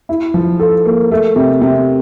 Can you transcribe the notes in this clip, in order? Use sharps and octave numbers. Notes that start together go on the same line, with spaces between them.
E4
F3
A4
A#3
A3
C3
C3